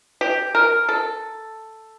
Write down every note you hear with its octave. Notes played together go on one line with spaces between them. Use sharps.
G4
A#4
A4